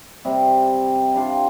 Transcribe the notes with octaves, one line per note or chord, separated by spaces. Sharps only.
C3 G3 C4
G3 D4 F4